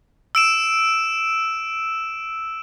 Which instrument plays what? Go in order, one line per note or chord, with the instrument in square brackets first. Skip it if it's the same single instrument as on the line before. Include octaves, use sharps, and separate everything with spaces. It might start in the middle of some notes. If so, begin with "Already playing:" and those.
[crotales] E6 D7 E7